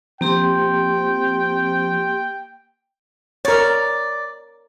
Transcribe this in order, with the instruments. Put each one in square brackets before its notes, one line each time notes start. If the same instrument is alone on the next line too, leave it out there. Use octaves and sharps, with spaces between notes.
[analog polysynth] F3 C4 [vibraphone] A#3 G4 C6 [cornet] G5
[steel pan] A#4 C#5 [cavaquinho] D5